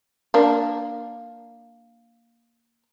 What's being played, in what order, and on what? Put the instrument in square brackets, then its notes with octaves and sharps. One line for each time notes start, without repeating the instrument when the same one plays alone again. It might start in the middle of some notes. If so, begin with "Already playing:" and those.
[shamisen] A#3 D4